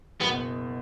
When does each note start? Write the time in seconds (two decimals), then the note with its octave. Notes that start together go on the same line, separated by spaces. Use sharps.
0.21 F#1 B2 B3